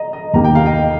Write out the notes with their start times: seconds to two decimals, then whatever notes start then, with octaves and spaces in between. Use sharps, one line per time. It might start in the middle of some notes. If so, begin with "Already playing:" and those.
Already playing: D#5 A#5
0.13 D#5
0.34 D#2 D#3 A#3 G4 A#5
0.44 G5
0.55 F5
0.66 D#5 G5